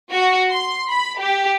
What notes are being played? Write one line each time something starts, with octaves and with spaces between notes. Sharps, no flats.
F#4
C6
B5
G4